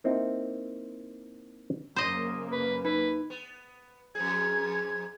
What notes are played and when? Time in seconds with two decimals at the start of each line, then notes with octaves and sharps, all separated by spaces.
0.04 A#3 C4 D#4 E4
1.96 F#2 C#3 A#3 C5 D#5
2.52 B4
2.85 D#4 B4
3.30 B3
4.15 F2 G#2 G#4 G#6